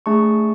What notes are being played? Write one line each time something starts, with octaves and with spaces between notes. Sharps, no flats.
A3 D4 G#4 A5 C#6